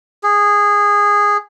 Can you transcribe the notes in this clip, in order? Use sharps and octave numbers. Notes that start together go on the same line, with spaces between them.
G#4